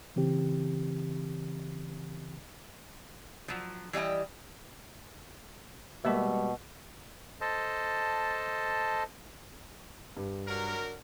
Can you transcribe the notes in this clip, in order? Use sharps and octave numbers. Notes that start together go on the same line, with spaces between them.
C#3 E3 C4 G4
F3 F#3
E3 G3 D#5 G5
B2 G3 G#3 A#3 G4 E5
A4 C5 D#5 A5
G2
F#3 D4 A#4